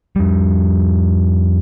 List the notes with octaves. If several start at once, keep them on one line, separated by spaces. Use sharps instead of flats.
F2 G3